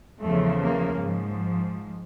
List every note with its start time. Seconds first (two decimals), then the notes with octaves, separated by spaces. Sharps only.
0.20 E2 C#3 F3 A3
0.61 A#3
1.01 G#2 F3